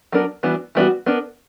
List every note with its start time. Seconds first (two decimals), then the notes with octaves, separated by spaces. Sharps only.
0.12 F#3 B3 D4 A#4
0.43 E3 G3 B3 D4 F#4
0.75 E3 G3 B3 D4 F#4
1.06 B3 D4 A#4